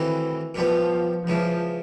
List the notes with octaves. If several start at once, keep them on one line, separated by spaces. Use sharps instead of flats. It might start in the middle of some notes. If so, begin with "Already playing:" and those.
Already playing: D#3 E3 F#3 A3 C4 D#4
A#2 F3 G3 B3
C#2 C#3 E3 F3